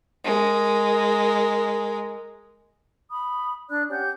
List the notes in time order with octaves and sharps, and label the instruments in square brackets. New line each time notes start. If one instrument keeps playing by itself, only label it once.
[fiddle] G#3 A#4
[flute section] B5 D#6
D4 D5 F#6
C#4 G4 F#5 G6